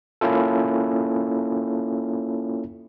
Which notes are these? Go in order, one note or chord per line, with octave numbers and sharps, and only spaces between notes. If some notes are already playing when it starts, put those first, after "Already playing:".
A#3 C#4 E4 F4 A4